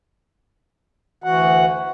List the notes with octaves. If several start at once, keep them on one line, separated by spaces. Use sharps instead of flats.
D2 E3 F#4 F#5